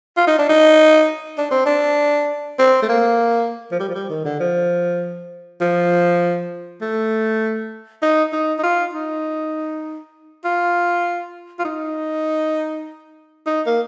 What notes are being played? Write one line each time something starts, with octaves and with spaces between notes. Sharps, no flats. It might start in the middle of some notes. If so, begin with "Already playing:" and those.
F4
D#4
D4
D#4
D4
C4
D4
C4
A3
A#3
F3
G3
F3
G3
D#3
D3
F3
F3
A3
D#4
D#4
D#4
F4
D#4
F4
F4
D#4
D#4
A#3